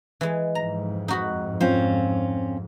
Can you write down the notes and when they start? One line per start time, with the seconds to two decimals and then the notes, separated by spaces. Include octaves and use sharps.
0.21 E3 G#3
0.55 F2 G#2 A#5
1.08 D#4 F#4 B5
1.61 C4 C#4 F4 C5